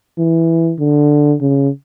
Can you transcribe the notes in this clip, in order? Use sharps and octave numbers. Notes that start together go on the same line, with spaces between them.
E3
D3
C#3